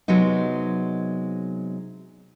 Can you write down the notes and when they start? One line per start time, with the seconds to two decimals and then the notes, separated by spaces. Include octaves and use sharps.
0.08 C3 F#3 G#3 B3 D#4